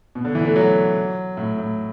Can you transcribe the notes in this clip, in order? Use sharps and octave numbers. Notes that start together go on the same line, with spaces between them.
B2
D3
E3
A3
F#3
A2
A2